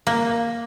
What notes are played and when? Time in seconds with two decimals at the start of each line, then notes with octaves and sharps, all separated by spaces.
0.07 A#3